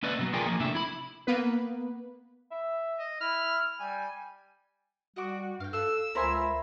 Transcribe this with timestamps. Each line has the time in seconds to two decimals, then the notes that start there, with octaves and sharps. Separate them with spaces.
0.03 A#3 C#4 E4 B4 D5 D#5
0.19 B2 F#3
0.33 F4 G#4 A#4 D5 G5 G#5
0.46 F3 A#3
0.60 A2 C3 D4 E5
0.75 E4 B5
1.27 A#3 B3 B4
2.52 E5
2.99 D#5
3.21 E4 F6
3.80 G3 G#5
5.16 G3 F#4 D#5 D6
5.60 G2 F5 G5
5.73 A4 F5 C6 E6 F#6
6.15 C#2 E4 A#4 C5 F5 G#5 B5